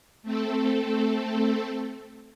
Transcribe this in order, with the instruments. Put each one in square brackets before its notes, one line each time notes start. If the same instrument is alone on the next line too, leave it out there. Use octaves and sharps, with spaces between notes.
[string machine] A3 C4 A4